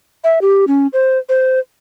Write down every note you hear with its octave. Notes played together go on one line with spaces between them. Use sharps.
E5
G4
C#4
C5
C5